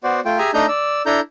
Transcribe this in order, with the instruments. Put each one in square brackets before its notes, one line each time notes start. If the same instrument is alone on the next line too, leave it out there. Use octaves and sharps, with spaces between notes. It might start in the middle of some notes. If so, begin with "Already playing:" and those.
[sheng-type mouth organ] B3 F#4 C5 D5
A3 F4 G5
G4 G#4 E5 G#5 A#5
A3 D4 D#4 D#5 A#5 G6
D5 E6
D4 E4 A4 A#5 G6